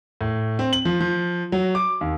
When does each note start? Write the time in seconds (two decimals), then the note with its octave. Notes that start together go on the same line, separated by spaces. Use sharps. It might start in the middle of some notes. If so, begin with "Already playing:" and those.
0.21 A2
0.59 C4
0.73 F#7
0.85 F3
1.00 F3
1.52 F#3
1.75 D6
2.01 D#2